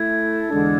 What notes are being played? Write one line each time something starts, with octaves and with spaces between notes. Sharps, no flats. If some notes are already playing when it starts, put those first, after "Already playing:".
Already playing: A3 E4 A4 G#6
E2 D3 G#3 D4 A4